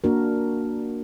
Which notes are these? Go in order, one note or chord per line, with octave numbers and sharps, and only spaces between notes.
A#3 D4 F#4 A#4